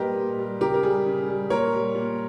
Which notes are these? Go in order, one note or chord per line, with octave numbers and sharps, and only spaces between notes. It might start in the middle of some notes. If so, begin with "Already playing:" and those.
Already playing: A#2 G3 G4 A#4 B4 D#5
A#2
G3
C#3 G4 A#4
A#4
G3 G#4
C#3
G3
A#2 A#4 C#5
G3
A#2